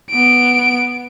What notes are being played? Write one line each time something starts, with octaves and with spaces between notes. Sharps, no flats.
B3 D7